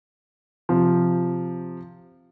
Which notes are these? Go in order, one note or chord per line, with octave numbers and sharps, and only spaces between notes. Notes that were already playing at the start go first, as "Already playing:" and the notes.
C3 F3